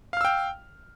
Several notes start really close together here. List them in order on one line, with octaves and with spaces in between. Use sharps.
F5 F6 E6 G5